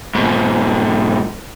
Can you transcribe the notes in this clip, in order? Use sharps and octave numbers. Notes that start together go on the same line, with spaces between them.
G#2 B2